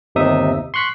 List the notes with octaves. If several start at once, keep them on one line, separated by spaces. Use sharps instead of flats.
G1 D#2 C3 D#4 E5 D#6
C6 C#6 F#6 B6